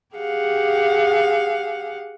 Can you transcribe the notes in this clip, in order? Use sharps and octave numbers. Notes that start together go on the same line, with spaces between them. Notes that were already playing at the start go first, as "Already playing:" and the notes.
G4 G#4 F5 F#5